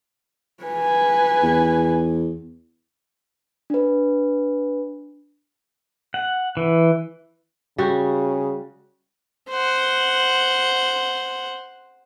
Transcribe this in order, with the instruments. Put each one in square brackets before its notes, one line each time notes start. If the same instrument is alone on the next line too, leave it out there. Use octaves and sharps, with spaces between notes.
[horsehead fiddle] B4 G#5
[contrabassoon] E2
[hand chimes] D4 B4
[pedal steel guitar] F#5
E3
[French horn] C#3 [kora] G3 F#4
[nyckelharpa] C5 F#5